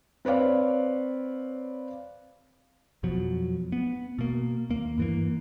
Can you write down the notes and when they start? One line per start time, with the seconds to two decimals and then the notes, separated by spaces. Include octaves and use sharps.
0.25 C4 B4 C#5 D5 F5
3.03 F2 B2 F3 F#3
3.72 B3
4.19 B2 A#3
4.70 D#2 A#3
4.98 G2 E3 A#3